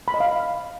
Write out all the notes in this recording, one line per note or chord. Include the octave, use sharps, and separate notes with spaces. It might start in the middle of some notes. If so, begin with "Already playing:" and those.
B5
D#5
F5